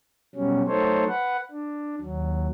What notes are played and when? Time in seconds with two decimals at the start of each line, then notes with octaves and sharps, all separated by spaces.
0.35 B2 F#3 G3 C#4
0.68 F#3 A3 D#4 A4 C5 C#5
1.08 B4 F#5
1.51 D4
2.01 D#2 F#3